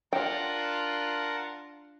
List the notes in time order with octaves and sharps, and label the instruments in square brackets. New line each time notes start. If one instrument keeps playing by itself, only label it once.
[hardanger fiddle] D4 F4 [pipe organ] A#4 F#5 A5 [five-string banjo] G5